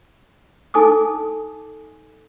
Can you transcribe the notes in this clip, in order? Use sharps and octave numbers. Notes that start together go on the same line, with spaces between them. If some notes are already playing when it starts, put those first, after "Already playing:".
D#4 A4 G#5 D6 D#6